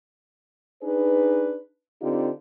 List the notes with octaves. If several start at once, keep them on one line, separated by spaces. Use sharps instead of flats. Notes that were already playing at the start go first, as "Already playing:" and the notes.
D4 D#4 G#4 B4
D3 C4 D#4 F4 G4